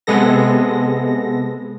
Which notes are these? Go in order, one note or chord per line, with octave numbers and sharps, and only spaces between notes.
C3 G#3 B3 A4 A#6